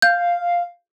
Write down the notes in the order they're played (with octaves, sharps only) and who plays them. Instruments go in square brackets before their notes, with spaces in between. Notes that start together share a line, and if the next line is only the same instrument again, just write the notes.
[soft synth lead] F5 [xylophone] G6